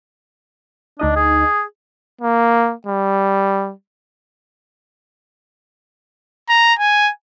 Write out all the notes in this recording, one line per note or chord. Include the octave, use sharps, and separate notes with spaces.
D2 D4 D#4 D#5
G#4
A#3
G3
A#5
G#5